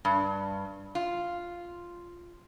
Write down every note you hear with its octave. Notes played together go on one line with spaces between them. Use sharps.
G2
F4